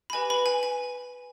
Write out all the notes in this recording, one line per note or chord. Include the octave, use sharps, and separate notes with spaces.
B5
G4 B4 D#5 G#5
B4 B5
G#5
G#5